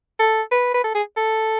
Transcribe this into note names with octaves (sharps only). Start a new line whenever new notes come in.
A4
B4
B4
A4
G#4
A4